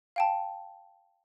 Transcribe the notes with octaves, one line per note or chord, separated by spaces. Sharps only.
F5 G5 A5